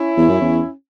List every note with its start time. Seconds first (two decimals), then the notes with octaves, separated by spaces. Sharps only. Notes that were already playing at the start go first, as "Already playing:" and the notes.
Already playing: C#4 E4
0.17 E2
0.29 F#2
0.41 E2